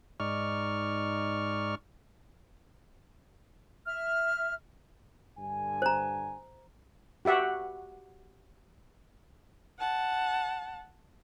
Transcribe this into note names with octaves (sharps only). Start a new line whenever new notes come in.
G#2 D#4 D5 C#6 F6
E5 F6
G2 D3 G#5
C5 A#5
F#4 G4 E5 F#5
F#5 A5